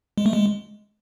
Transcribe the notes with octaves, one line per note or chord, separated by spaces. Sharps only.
G#3
A3
G#3